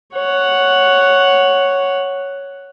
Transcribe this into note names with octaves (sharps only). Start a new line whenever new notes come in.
C#5 F#5